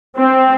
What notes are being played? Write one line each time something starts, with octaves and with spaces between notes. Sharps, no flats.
C4